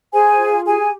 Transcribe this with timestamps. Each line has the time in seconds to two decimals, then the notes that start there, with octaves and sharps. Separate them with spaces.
0.13 G#4 C5 G#5
0.39 F4
0.65 G4 G#4 G#5